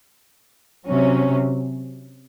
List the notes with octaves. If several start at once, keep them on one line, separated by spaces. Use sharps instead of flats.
C3 F#3 C#4